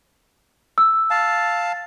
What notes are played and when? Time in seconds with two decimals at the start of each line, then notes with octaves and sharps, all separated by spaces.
0.78 E6
1.10 F5 A5